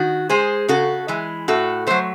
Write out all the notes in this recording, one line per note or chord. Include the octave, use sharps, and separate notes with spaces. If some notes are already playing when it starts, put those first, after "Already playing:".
Already playing: D#3 F#4
G#3 G#4 C5
C#3 F#4 A4
E3 G#3
A2 F#4 A4
F#3 A3 C5